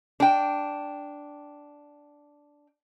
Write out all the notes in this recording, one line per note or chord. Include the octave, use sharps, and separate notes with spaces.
D4 G5